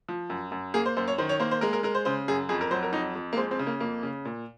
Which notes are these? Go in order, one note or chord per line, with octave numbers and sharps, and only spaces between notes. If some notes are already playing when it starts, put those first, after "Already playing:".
F3
F#2
F#2
A#3 G#4
C5
F#2 C5
C#5
D#3 C5
C#5
A#3 C5
C5
G#3 A#4
A#4
G#3 A#4
C5
C#3 C5
F#2 G#4
F2 G#4
A#4
F#3 C5
A#4
F2 D#4
F2
A#3
G#3 C4
C4
C#3
A#3
F2 A#3
C#3
A#2